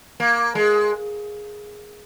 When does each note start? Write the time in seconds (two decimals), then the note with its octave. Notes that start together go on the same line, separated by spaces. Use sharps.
0.20 A#3
0.55 G#3